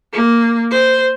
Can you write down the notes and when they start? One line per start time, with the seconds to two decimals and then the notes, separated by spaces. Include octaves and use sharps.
0.13 A#3
0.70 C5